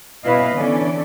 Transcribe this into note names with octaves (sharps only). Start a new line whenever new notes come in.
B2 C#4 E4 B4 D#5 F5
D3 E3 B3 C#4 A4 D5